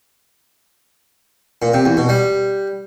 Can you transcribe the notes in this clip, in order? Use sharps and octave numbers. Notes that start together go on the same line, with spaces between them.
A#2
C3
E2
B2
G3